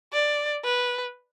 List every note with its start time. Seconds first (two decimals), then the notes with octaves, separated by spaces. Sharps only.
0.13 D5
0.64 B4